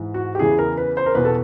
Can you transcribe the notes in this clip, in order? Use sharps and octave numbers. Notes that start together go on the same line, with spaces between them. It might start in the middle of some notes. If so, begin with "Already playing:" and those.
Already playing: G#2 E3
F#4
G4
E2 C#3 E3 G#4
A#4
B4
C5
A#4
E2 B2 B4
A4